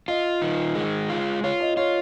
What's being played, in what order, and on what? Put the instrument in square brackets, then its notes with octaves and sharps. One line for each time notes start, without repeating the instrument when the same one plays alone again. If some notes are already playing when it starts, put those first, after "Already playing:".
[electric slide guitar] F4 [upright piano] D#5
[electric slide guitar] D#3
G#3
F4
[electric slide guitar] F4 [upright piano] C#5
[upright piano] D#5
[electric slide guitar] F4 [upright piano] C#5